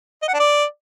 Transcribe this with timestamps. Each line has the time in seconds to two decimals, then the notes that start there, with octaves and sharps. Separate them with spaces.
0.22 D#5
0.28 F#5
0.34 D4
0.39 D5